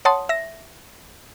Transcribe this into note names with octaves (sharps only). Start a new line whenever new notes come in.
C#5 F#5 A5 C6 D#6
E5 A#6